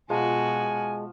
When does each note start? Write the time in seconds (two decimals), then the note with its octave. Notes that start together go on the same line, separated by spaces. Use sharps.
0.10 B2 F3 G#3 F#4 G#5